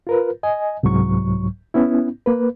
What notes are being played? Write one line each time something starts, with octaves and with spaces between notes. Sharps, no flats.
F4 A#4 B4
D#5 G#5
C2 G#2 F#3 C#6
B3 C#4 E4
A#3 B4